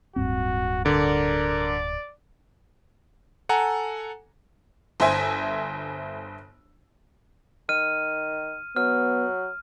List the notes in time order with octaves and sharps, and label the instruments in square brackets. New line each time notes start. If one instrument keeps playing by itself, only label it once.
[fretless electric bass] D1 G2 C4 [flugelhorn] F#4
[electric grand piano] D3 [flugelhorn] A#4 [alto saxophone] D5
[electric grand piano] A4 F#5 G#5 A#5
[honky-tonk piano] G1 C5 E5 G#5
[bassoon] D#3 [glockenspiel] F6 D#7
[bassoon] F#3 [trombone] B3 [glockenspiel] F6